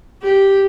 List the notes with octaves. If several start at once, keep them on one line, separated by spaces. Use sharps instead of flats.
G4